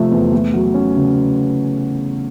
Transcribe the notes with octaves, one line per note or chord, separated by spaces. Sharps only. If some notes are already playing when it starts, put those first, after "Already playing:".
Already playing: C3 F3 A3
E2
A3
F#3
C#4
C#3